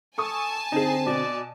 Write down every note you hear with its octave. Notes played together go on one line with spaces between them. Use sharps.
A4 G#5 A5 C#6 D#6
D3 C4 D#4 G#4
B2 D5